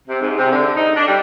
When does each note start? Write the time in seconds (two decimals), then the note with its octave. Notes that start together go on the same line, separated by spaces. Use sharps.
0.08 C3
0.20 G#2
0.37 C3
0.52 D3
0.75 D#4
0.95 D4
1.08 G3